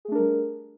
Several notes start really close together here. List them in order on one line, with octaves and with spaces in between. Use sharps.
G#4 A3 D4 A#4 G3